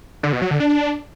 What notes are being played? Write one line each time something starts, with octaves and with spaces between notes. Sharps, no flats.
D3
B2
F#3
D3
D4